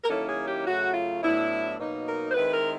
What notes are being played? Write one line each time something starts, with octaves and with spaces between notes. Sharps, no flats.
A#4
D#3 F#3 A#3 C#4 E4 A4
G#4
G4
C#3 F#3 A3 F#4
F4
A2 F#3 B3 D4 E4
B2 F#3 A#3 D#4
A#4
C5
D#3 G#3 C4 E4 B4
A#4